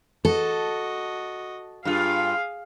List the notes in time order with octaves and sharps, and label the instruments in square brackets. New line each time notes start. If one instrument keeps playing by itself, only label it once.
[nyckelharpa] F#4 D#5 [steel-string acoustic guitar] A4
[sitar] G2 F4 [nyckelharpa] G#4 [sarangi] F5